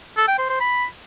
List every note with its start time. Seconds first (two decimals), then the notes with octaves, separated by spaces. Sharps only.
0.17 A4
0.28 G5
0.39 C5
0.49 C5
0.60 B5